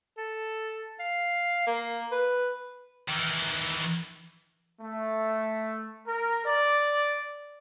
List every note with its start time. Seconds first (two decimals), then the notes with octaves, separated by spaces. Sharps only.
0.17 A4
1.00 F5
1.66 A#3
2.12 B4
3.08 D#3 E3
4.81 A3
6.07 A#4
6.44 D5